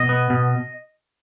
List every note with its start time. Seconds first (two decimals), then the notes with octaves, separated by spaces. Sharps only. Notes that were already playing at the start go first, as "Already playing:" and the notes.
Already playing: B2 D#5
0.09 B3
0.30 B2